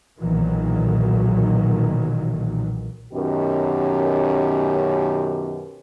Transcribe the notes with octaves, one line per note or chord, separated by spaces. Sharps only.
B1 A#2 D#3 E3 F#3
F#2 B2 D#3 C#4 G4